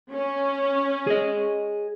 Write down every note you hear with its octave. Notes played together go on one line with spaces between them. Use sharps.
C#4
G#4 D#5